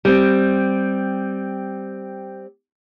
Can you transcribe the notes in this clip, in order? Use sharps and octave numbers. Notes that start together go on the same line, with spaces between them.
G3 C4